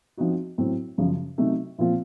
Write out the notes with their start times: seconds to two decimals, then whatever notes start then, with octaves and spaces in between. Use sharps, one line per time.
0.18 F3 C4 D#4 F#4
0.58 A2 F#3 C4
0.98 F#2 C#3 F3
1.38 C3 F#3 A3 D#4
1.78 A#2 F3 C4 F4